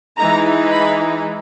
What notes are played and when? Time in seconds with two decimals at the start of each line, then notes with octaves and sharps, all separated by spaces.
0.17 E3 G#3 D#4 A#5
0.71 B5